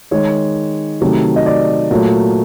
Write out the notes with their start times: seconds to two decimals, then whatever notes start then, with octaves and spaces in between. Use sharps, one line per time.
0.11 D#3 G#3 C#5
1.01 C3 D#3 F#3 A3
1.36 D#5
1.46 D5
1.91 A#2 F#3 A3